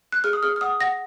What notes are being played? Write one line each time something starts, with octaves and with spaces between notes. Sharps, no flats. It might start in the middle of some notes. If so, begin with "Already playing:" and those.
F#6
G#4 F6
D#6
G#4 F6
F6
F#5 D#6
F#5 A#6